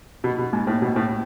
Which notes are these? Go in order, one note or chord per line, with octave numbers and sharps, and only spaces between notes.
B2
B2
G#2
A2
B2
A2